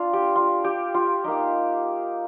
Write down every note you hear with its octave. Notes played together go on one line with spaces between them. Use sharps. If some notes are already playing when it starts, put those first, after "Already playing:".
Already playing: D4 F4
G4
F4
G4
F4
A#3 D#4 G4